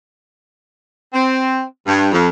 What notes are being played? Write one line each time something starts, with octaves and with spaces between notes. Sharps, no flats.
C4
G2
F2